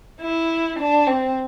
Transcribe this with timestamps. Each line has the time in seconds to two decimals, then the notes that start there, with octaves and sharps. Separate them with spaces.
0.21 E4
0.79 D4
1.07 C4